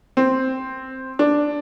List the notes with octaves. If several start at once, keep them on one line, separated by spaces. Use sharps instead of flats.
C4
D4